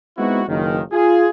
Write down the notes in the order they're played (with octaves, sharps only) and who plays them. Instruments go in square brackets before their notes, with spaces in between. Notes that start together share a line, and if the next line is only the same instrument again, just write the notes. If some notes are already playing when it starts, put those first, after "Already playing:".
[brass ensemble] G#3 B3 C4 D#4 E4 F#4
F#1 C#2 D#3
F4 G#4